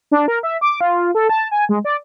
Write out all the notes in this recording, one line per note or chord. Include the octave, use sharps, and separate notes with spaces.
D4
A#4
E5
D6
F4
A4
A5
G#5
G#3
D5